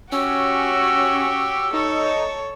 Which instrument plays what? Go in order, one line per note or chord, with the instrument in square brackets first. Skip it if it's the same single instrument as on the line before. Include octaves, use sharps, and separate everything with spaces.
[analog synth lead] C#4 [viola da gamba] F#4 G4 C#5 [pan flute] E6
[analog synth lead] D#4 [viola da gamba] A4 C#5